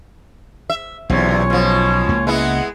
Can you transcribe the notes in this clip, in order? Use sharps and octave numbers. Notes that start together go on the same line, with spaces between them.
E5
B1 E2 C3 C#4 F4 C#5
B2 F3
C#2 A#3
G#3 B3 E4 D#5 E5 F#5